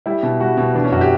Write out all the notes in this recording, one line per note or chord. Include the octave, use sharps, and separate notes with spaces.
G3 E4
B2
G3 F#4
B2
E3 D4
C#4
F#2 F#4
G4